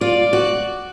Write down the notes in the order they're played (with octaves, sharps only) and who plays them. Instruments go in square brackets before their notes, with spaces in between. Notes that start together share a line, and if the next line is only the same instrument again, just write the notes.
[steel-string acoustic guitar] F4 [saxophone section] D5
[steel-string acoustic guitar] F#4